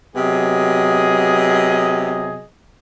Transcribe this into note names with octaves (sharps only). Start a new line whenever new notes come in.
C3 F#3 B3 G#4 D#5